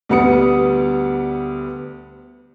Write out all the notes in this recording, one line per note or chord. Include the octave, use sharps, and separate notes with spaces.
D2 G3 B3 D#6 C#7